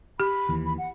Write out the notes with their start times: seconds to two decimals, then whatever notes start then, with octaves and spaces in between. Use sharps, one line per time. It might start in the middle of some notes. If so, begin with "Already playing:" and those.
0.20 G4 B5
0.49 D#2 E3
0.66 B5
0.78 F#5